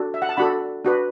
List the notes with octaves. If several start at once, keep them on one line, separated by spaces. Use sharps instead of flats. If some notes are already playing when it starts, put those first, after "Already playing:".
Already playing: D4 F#4 A4
E5
F#5
A5
D4 F#4 A4 F#5 B5
D4 F#4 B4